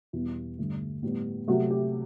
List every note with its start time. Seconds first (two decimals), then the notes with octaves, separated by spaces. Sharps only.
0.13 E2 B2 G3 B3 E4
0.59 G2 D3 A3
1.03 A2 G3 B3
1.48 C3 F#3 A3 F#4
1.70 G4